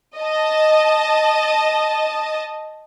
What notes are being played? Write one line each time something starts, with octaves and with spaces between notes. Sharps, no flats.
D#5 A5